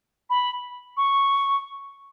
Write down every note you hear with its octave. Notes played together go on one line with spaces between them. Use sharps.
B5
C#6